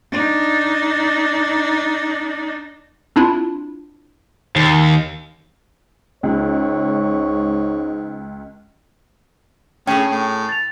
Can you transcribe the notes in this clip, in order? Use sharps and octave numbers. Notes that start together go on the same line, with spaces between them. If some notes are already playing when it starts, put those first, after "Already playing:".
D4 D#4
C4 D4 E4 F4
D#2
C#2 G#2 C#5
A2 C#4 G#4 G5
A2
A6 F7